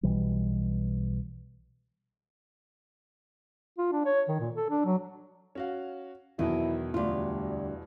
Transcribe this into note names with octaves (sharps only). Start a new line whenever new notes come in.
B1 B2 E3 G3
F4
D4
C#5
D#3
A#2
A4
D4
F#3
C#4 F#4 F5
E2 B2 D#3 F#3 E4
D2 G3 F4